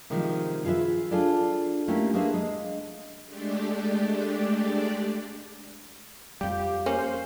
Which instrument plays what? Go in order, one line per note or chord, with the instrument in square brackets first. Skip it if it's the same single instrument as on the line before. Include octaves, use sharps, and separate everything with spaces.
[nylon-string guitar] C3 D#3 F3 G#3
F4 G#4 A4 B4 E5
D4 F4 G#4 A4 D5
A3 A#3 C#4 E4 G4
A#3 D4 G#4 B4 C5 E5
G#3
[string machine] G#3 A3 D4 G4 D5
[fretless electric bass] F2 G3 [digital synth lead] G4 [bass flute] F5
[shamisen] A#3 C#4 [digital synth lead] C5